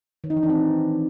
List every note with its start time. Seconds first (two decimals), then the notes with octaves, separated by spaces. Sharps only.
0.24 D#3
0.30 D#4
0.37 E3
0.43 D4
0.49 C4